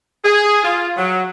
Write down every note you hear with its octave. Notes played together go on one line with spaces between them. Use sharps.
G#4
F4
F#3